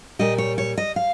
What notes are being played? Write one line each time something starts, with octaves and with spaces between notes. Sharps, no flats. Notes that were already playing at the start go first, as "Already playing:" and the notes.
A#2 G3 D#5
C#5
C#5
D#5
F5